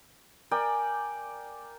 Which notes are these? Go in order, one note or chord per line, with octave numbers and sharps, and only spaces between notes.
A#4 D5 G5 G#5